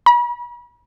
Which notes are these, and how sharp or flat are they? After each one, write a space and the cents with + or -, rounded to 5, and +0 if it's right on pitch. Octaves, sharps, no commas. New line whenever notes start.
B5 -40